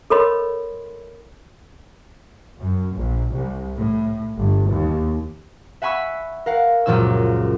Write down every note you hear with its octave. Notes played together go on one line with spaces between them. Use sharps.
A4 A#4 C#5 D#5 B5 C6
F#2
A#1
C2
A2
G1
D#2
E5 F#5 G#5 B5 C#6 E6
A#4 F5 F#5
C#2 F#2 A#2 F3 C#4 E6